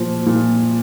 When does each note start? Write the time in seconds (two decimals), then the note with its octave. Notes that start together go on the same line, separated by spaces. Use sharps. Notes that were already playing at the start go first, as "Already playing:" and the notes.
Already playing: A#2 F3
0.26 A#2